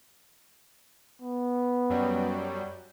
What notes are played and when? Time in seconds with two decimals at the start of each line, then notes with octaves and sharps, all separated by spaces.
1.22 B3
1.90 F#2 F#3 G3